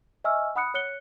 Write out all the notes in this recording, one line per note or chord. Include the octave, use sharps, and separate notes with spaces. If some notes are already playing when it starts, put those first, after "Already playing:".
D#5 E5 G#5 C#6 E6 F6
F#5 B5 D#6 F#6 C#7
C#5 F#6 C#7 G7